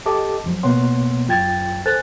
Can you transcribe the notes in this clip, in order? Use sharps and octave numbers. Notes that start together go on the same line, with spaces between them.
G4 A4 D#5 A5 D6
F2 F3 F#3
B2 A#3 B3 C#5 F#5 C6
F#2 F#3 F4 G5 G#6 A6
A4 C5 G#5 F#6 A6